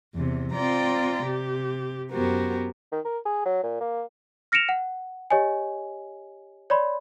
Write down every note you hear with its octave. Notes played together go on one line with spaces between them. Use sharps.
E2 C3
C4 F4 D5 G5 A#5
C3 G4
F#2 B3 F#4 G4 A#4 C5
D#3
A#4
G#4
F#3
A#2
A#3
F6 A#6 C#7 D7 E7 F7
F#5
G4 C#5 D#5 G#5
C#5 D5 B5 C6